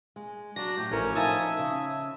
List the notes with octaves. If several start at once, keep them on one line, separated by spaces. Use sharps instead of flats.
G#3
F#3 D4 A#6
A2 F#3 G4
A1 F3 C#4 E4 A#4
F3 D#4 E5 G#5 A5 D#6 G#6
C#3